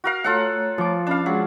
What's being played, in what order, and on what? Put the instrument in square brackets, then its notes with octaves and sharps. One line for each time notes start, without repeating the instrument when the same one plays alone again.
[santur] F#4 A#4 F5
[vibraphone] A3 C#5 A#5 [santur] F4 A4 F#5
[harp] F3 D6
[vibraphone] C#4 B5 [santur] D4 F5
[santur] F#3 [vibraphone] G#3 G#4 F#5